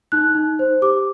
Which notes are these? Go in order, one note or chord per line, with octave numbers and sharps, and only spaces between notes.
D#4 F#6
D#4
C5
G4 D6